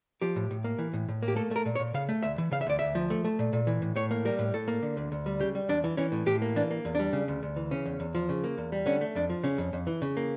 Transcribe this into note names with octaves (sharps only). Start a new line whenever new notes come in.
F3 G4
A2
A2
A#3
E3
A2
A2
A#3
G4
A3 A4
A3 A#4
A#2
C#5
A#2
C#3 F5
A3
D2 E5
E3
C#3 F5
E5
D2 D5
D2 E5
F3
A3
A3
A#2
A#2
E3
A2
A2 C#5
A#3
G3 A#4
A2
A2 A4
A#3
D3
D2
D2
G3
C#3 G4
G3
E2 D4
E3
E3 C#4
A2
A2 G4
A#3
E3 D4
A#3
E2
G3 D4
C#3
D2
D2
E3
C#3 C#4
E2
E2
F3
C#3
A#3
E2
G3
D3 C#4
A3
F2 D4
F3
C#3 C#4
F2
F2
E3
C#3
A#3